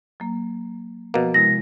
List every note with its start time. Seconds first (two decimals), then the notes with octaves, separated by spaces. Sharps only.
0.20 F#3 A#3
1.14 B2 F3 A#3
1.34 C3 G#3 E4 A#6